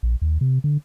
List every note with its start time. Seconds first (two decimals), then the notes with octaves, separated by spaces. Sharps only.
0.03 A#1
0.22 D#2
0.41 C3
0.64 D3